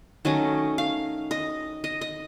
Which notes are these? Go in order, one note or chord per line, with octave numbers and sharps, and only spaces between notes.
D#3 F#3 A3 C#4 D#5
F5
D#5
D#5
D#5